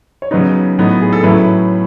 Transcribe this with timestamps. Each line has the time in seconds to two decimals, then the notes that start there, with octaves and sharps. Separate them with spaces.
0.22 C#5
0.31 C#3 F#3 B3 D#4 B4
0.78 A2 F#3 B3 D#4
1.02 G#4
1.13 A4
1.23 A2 F#3 A3 C#4 E4 B4